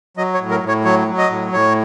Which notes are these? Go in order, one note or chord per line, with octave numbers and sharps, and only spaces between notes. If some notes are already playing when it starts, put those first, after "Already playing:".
F#3 D#5
C#5
A2
A#4
A2
C#5
F#3 C#5
F#3
D#5
A2
A2 C#5